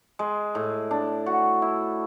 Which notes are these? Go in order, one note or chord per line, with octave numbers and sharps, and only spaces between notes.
G#3
A2
D4
F#4
E4